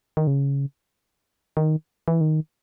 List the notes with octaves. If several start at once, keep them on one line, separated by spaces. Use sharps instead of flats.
D#3
C#3
D#3
E3
D#3